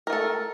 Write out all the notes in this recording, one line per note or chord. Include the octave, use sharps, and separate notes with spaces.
A3 A4 A#4